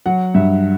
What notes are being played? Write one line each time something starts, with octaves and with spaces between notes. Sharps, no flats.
F#3 F#5
G2 E5